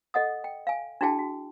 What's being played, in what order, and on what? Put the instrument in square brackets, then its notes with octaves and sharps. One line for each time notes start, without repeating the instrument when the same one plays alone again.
[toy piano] A4 D#5 F#5 D#6
G5
F5 G#5
D4 E4 F#4 G#4 G5 A5
F#4